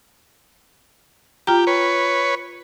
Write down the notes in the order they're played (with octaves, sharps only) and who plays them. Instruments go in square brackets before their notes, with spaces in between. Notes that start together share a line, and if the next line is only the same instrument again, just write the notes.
[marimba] F4 G5 A#5 [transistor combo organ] G4
[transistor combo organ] B4 C#5